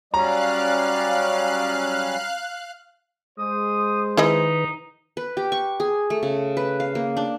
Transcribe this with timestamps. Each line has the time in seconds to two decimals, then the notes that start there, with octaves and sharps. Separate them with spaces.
0.14 F#3 G3 C#4 D5 F5 A#5 F#6
3.39 G#3 C5 D#6
4.17 D#3 D#4 E4 G#4 B4 D#5
5.17 B4
5.37 G4
5.52 C#6
5.80 G#4
6.10 A3
6.23 C#3
6.57 B4
6.80 F5
6.95 A#3
7.17 D4